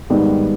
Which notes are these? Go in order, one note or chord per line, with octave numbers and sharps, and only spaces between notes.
G#2 D#3 G3 B3